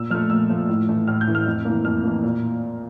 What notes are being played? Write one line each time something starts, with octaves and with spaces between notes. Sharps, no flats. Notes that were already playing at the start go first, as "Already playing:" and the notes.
Already playing: A#2 E6
F3 A3 F6
A#2 E6
F3 A3
A2
E3 A3
A2 F6
G6
E3 A3
F6
F2
E3 A#3
F2 F6
E3 A#3
A#2